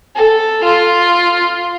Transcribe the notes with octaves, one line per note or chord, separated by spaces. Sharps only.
A4
F4